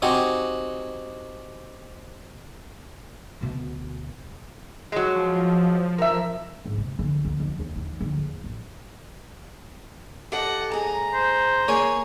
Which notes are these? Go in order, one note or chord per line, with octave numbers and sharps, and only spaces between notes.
C4 D#4 F#4 G4 F#5 G#5
D2 B2
F#3 G#3
F3
A#4 E5
G#2
C3
D3
D2
F2
D#2
D#3
D2
E2
A1
G4 A4 D#5 F#5
G#2 G#4 A#5
C5
A#3 G#4 C#5 F5 G#5